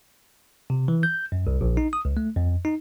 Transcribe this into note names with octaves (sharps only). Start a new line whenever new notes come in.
C3
E3
G6
F#2
C2
A#1
D#4
D#6
C#2
A3
F2
D#4